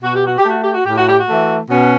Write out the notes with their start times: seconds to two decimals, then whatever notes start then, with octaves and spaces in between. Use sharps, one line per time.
0.02 B2 F#4
0.14 G4
0.26 F#4
0.37 G4
0.45 A3 F#4
0.61 G4
0.72 F#4
0.84 A2 G4
0.96 F#4
1.07 G4
1.19 F#4
1.28 E3 A3
1.70 B2 C#4